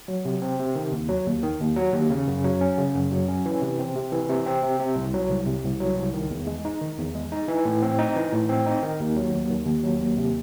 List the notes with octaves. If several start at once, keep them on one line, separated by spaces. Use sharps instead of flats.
F#3
C3
C4
C3
D#3
D#2
F#3
D#2
D#3
D#2
F#3
D#2
C#3
F#2
F#3
C#4
C#3
F#2
F#3
C#4
E3
C3
C4
C3
E3
C3
C4
C3
C3
C2
F#3
C2
C3
C2
F#3
C2
D#3
E2
G#3
D#4
D#3
E2
G#3
D#4
E3
A2
C4
D#4
E3
A2
C4
D#4
D#3
D#2
F#3
D#2
D#3
D#2
F#3
D#2
C3